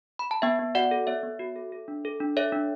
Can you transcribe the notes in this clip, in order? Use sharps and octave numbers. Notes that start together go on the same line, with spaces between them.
B5
A5
B3 E5 G5
B3
F#4 D5 F#5
A4
B3 C#5 E5
B3
F#4
A4
A4
D4
A4
D4
A4 C#5 E5
D4